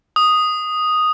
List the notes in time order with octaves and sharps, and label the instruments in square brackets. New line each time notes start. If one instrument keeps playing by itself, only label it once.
[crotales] D#6